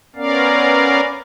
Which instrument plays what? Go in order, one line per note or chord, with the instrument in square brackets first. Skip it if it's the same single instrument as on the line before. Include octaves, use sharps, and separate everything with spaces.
[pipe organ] B3 C#4 A#4 D5 F5